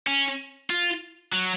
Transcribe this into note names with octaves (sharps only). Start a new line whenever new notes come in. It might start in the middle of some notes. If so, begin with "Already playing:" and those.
C#4
F4
F#3